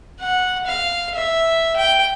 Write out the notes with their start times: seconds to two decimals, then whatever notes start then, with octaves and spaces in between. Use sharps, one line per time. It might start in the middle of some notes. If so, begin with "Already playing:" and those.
0.21 F#5
0.66 F5
1.15 E5
1.76 G5